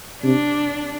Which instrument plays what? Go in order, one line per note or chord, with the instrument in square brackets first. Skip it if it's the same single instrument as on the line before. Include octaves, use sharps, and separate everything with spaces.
[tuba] C3 [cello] D4